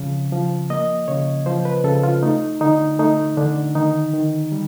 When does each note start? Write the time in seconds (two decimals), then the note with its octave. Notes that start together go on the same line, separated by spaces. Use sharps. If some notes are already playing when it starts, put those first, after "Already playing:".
Already playing: C#3 F3
0.32 F3
0.70 A#3 D#5
1.08 C#3 C#5
1.46 F3 C5
1.65 B4
1.84 C#3 A4
2.03 F4
2.23 A3 D#4
2.61 D3 D#4
2.99 A3 D#4
3.37 D3 D4
3.75 D#3 D#4
4.14 D#3
4.52 G3